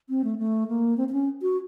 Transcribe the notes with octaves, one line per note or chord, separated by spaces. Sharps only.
C4
A3
A3
A#3
C4
C4
C#4
F#4